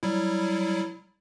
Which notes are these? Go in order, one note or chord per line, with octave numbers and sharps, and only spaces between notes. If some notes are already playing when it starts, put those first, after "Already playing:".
F#3 G3 E4